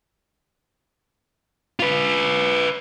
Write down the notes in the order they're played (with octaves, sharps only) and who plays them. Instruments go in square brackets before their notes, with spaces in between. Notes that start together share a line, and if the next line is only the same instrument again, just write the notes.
[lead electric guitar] F4 B4